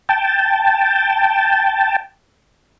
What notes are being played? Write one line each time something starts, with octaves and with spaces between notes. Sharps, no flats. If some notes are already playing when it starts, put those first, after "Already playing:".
G5 A5